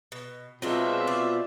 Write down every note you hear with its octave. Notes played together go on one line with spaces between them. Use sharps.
B2
B2 F#3 G#3 C4 D4 F4 E5
D5